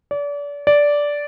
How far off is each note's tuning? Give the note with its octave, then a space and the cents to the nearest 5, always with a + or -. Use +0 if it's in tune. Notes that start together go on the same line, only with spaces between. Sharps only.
D5 -35
D5 -10